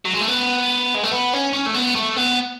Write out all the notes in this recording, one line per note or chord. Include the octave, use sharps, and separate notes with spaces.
F#3
G#3
A3
B3
G#3
A3
B3
C#4
C#4
A3
B3
A3
B3